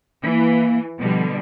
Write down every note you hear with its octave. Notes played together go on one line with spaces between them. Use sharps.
E3 A#3
B2 D3 F3 G3